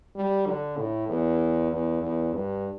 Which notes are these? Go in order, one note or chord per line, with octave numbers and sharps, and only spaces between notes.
G3
D3
A2
E2
E2
E2
G2